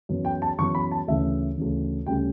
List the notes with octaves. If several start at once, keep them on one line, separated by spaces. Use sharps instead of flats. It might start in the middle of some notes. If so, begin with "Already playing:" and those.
F#2 E3 B3
G5
A5
F#2 E3 B3 C#6
B5
A5
D2 C#3 E3 E5
D2 C#3 E3
D2 C#3 G3 C#4 G5